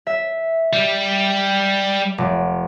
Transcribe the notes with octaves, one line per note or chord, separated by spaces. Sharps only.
E5
G3
F1